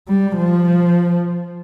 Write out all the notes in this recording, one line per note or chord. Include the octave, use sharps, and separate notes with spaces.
G3
F3